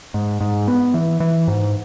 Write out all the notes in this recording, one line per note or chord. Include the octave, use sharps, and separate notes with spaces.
G#2
G#2
B3
E3
E3
G#2